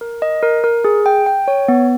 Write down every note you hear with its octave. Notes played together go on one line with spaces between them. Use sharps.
A#4
D#5
A#4
A#4
G#4
G5
G5
C#5
B3